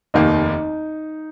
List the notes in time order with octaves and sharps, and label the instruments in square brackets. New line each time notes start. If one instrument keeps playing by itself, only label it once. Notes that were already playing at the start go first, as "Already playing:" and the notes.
[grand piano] F1 D#2 D#3 A#3 [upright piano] D#4